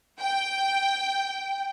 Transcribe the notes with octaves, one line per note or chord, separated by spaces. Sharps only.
G5